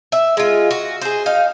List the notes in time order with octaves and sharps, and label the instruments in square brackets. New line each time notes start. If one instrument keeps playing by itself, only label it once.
[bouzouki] E5
G#3 F4
F#4
G#4 C5
D#4 F5